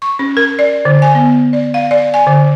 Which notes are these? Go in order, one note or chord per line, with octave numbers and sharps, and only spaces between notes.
C#6
C#4
A#4
D5
D3
G#5
B3
D5
F5
D5
G#5
D3